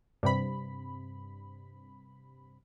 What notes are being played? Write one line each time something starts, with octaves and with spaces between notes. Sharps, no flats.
G2 C3 B5